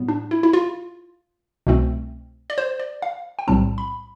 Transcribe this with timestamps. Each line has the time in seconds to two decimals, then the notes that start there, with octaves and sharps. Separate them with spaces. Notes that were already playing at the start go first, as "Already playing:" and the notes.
Already playing: A2 G3 B3
0.08 D4
0.31 E4
0.43 E4
0.53 F4
1.67 C2 B2 A3 C4
2.50 D5
2.58 C5
2.79 D5
3.02 F5
3.39 G5
3.48 B1 A2 G3 C4 A5
3.78 B5